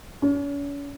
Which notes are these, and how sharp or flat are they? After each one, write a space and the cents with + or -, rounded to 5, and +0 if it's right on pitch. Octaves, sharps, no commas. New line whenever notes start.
C#4 +40